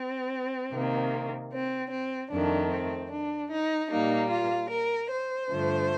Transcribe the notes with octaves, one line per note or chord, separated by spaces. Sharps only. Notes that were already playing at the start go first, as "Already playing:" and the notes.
Already playing: C4
C3 D#3 A#3
C4
C4
F2 D#3 A3 D4
C4
D4
D#4
A#2 G3 A#3 D#4
F4
A#4
C5
G2 D3 F3 A3